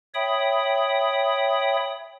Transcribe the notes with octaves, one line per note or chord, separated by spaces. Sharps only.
C#5 E5 G5 B5 D#6